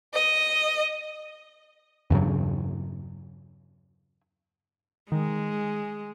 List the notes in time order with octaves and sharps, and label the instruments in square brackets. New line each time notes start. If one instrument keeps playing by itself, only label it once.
[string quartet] D#5
[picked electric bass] E2 G2 C#3 F#3
[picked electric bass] D#3 [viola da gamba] G#3